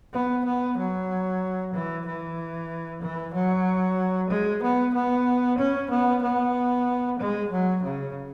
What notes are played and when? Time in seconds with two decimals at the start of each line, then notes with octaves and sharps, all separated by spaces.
0.13 B3
0.45 B3
0.77 F#3
1.74 E3
2.06 E3
3.02 E3
3.34 F#3
4.30 G#3
4.63 B3
4.94 B3
5.58 C#4
5.90 B3
6.22 B3
7.19 G#3
7.51 F#3
7.83 C#3